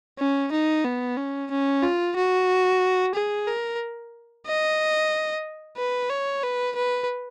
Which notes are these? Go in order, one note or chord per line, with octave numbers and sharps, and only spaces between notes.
C#4
D#4
B3
C#4
C#4
F4
F#4
G#4
A#4
D#5
B4
C#5
B4
B4